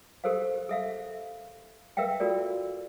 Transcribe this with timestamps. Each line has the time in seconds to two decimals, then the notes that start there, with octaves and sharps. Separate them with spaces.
0.24 G4 A4 A#4 C5 F5
0.69 A4 E5 F5
1.97 A#4 B4 E5 F5 G5
2.20 F4 F#4 A4 A#4 D5